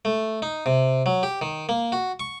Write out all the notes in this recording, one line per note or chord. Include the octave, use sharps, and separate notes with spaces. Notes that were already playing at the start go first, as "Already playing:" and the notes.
A3
D#4
C3
F#3
G4
D#3
A#3
F#4
C#6